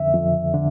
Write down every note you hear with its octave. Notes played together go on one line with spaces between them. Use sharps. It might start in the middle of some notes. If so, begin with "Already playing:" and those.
Already playing: F2 D3 E5
F2
D3